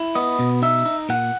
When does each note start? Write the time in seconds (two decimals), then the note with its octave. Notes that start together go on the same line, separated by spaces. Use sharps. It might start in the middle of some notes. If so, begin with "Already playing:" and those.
Already playing: E4
0.15 B3 D#5
0.39 B2
0.62 D#4 E5
0.86 D#4
1.09 A#2 F#5